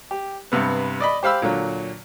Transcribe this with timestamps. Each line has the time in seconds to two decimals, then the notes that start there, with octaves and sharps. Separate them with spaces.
0.11 G4
0.52 G2 C3 B3
1.00 D5 D#5 B5
1.23 G4 C5 F5 B5 E6
1.42 A#2 D3 F#3